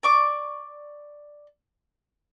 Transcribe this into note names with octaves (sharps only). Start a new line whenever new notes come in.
D5 C#6 D6